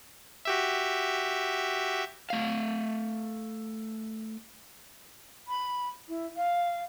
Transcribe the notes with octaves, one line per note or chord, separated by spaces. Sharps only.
F#4 G4 E5
A3 F5
B5
E4
F5